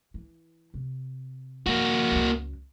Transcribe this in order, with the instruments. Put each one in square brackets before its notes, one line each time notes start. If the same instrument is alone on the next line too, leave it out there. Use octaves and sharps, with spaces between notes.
[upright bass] E3
C3
[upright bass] F3 [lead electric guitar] A#3 F#4
[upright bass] C#2 F#2